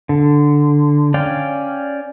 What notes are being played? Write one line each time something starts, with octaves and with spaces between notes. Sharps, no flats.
D3
C#4 D5 F5 G5